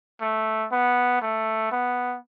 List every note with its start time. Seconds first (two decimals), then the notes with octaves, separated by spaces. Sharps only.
0.21 A3
0.72 B3
1.22 A3
1.72 B3